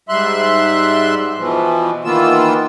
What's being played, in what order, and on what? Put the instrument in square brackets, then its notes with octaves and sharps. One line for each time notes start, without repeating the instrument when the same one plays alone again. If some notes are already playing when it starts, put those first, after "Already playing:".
[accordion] G#2 G3 E5 C6 F#6
B2 E3 F3
D#3 E3 A#3 B3 F4 E6